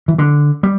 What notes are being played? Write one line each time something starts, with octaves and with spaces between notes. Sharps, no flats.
E3
D3
G3